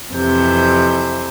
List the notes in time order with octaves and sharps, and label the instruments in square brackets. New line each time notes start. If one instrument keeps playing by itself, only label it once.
[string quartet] F2 C3 E3 G6